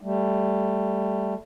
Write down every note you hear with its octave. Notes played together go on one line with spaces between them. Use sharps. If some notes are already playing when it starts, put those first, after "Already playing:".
G3 A3